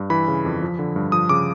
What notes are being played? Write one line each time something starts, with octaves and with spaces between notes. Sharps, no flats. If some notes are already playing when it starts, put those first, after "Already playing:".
Already playing: G2
E3 B5
C#3
F2
F3
D3
G2
F3 D#6
C#3 D6